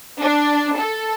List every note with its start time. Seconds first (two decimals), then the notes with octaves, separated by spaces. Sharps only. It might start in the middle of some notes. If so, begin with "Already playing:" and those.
0.21 D4
0.77 A4